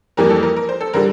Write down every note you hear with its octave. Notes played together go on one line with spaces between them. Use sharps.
F2 E3 G3 A#3 A#4
A4
A#4
A#4
C5
A4
D3 G3 A#4